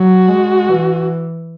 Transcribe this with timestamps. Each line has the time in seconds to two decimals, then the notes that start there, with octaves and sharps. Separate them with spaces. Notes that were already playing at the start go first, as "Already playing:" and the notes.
Already playing: F#3 F#4
0.28 G#3
0.69 E3